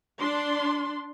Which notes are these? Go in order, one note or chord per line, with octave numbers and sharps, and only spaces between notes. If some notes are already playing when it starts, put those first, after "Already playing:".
D4 C6